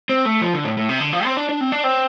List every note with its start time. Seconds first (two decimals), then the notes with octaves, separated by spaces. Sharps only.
0.09 C4
0.25 A3
0.42 F3
0.54 D3
0.65 A2
0.77 A2
0.89 C3
1.00 D3
1.13 F3
1.25 C4
1.37 D4
1.49 D4
1.61 C4
1.72 D4
1.84 C4